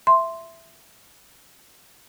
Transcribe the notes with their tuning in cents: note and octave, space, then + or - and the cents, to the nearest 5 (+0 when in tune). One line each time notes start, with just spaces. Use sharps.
E5 +10 C6 +0